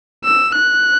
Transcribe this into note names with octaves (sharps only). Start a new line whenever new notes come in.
E6
F#6